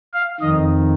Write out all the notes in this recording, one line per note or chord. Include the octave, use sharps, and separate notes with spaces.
F5
F2 D#3 D#5